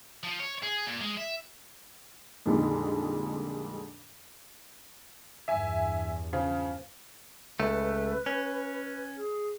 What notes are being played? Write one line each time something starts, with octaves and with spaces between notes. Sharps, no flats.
F3
C#5
G#4
A#2
G#3
E5
F2 A#2 D3 D#3 G3 G#3
E2 G2 E5 G#5
C#3 F3
C#2 A3 B4
C#4
G#4